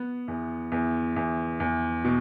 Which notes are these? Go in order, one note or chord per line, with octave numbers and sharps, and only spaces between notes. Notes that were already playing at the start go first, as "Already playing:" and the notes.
Already playing: B3
E2
E2
E2
E2
B2